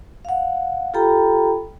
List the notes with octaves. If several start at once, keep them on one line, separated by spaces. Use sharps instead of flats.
F5 F#5
F4 G4 A4 G5 A#5 B5